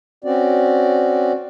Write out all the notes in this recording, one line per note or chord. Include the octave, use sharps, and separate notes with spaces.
C4 C#4 F#4 D5